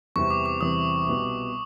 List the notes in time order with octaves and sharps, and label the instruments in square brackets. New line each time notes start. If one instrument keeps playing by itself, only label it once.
[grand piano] E2 C3 E3 G3 C4 [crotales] C#6
[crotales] D6
D6
[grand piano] E2 C3 E3 G3 C4 [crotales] D#6
[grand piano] C2 B2 G3 B3